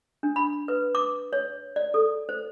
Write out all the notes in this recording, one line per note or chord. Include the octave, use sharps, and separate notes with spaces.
D4
B5
B4
D6
C#5
D5
A4
C5